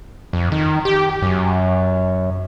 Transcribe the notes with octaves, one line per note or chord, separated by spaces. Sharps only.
F2
D#3
G4
F#2